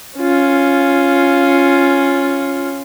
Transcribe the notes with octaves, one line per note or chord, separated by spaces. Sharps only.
C#4 F4